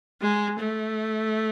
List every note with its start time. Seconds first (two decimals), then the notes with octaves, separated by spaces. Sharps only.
0.21 G#3
0.59 A3